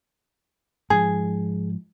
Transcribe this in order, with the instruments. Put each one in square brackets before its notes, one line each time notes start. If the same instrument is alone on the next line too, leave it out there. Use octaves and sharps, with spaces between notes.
[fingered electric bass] G#2 F3 [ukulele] G#4